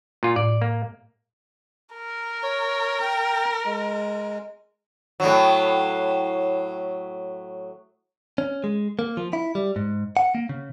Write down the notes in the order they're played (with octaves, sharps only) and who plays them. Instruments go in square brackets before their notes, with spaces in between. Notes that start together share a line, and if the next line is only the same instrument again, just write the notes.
[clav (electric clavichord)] A#2 F4
[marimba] A2 [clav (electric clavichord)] D5
[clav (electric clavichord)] A#3
[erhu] A#4
[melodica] C#5
G5
G#3
[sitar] A2 F#3
[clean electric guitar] C#4
G#3
A#3
F3
E4
G3
G#2
F#5
A#3
C#3